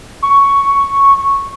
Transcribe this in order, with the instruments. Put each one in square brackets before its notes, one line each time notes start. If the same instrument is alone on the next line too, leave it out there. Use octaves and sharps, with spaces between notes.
[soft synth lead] C#6